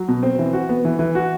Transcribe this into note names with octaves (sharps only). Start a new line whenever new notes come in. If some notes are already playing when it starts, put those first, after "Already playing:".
Already playing: F#3
B2
C4
E3
F#4
B3
E3
E3
F#4